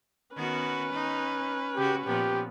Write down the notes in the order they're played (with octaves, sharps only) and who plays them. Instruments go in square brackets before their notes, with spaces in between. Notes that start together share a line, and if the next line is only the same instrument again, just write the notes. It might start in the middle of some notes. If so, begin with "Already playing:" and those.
[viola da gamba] D#3 B3 F#4 [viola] C#4 B4
[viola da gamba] D#4
[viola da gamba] C#3 F#4 [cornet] G4
[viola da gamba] A#2 F3 B3 [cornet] G4